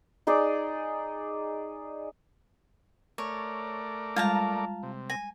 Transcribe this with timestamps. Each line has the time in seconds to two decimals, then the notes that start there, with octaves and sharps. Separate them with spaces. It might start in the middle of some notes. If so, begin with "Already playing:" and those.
0.27 D#4 G#4 D5 D6
3.18 A3 A#4 C#5 D5
4.16 G3 G#3 F4 A5 A#5
4.83 C3
5.10 G#5 A#6